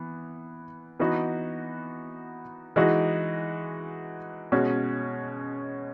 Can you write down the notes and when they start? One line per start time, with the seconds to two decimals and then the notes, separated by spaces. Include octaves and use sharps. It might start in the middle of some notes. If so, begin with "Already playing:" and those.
Already playing: E3 B3
1.00 E3 B3 D#4 F#4
2.76 E3 G#3 D#4 F#4
4.52 B2 G#3 C#4 F#4